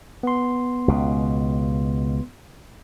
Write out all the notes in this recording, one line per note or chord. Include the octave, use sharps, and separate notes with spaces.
B3 C6
C#2 B2